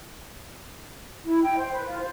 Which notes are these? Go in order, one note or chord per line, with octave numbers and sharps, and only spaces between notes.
E4
G5
C5
B4
F4
C5